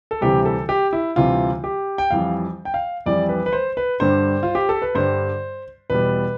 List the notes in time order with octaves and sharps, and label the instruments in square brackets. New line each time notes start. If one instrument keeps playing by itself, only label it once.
[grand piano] A4
D2 C3 E3 G3 G4
A4
G4
E4
D2 C3 E3 G3 F4
G4
G5
F2 E3 G3 F5
G5
F5
F2 E3 G3 D5
B4
B4
C5
B4
G2 D3 G3 C5
F4
G4
A4
B4
G2 D3 G3 C5
E2 B2 G3 B4